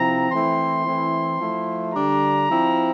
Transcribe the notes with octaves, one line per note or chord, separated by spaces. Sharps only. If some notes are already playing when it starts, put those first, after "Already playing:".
Already playing: C3 F3 C4 E4 A#5
E3 A3 C4 E4 C6
E3 A3 C4 E4
F3 A3 E4
D3 G3 D4 A#5
F3 C4 E4